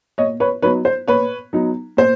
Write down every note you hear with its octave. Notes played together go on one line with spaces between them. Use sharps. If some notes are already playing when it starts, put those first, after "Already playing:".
A#2 C#5 D#5
B4 C#5
F#3 B3 D#4 B4 C#5
C5
A#2 B4 C#5
F#3 B3 D#4
A#2 C5